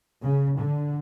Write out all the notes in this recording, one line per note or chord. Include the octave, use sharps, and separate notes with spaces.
C#3
D3